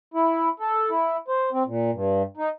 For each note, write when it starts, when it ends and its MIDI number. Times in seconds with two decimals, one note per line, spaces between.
0.14 0.49 64
0.60 0.90 69
0.90 1.17 64
1.28 1.50 72
1.52 1.63 60
1.67 1.91 46
1.92 2.23 43
2.37 2.49 63